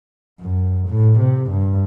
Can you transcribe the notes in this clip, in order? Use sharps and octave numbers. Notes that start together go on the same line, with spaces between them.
F#2
A2
C3
G2